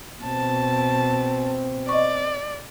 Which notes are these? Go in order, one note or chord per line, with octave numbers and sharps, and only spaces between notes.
B2 C4 A5
D5 D#5 C#6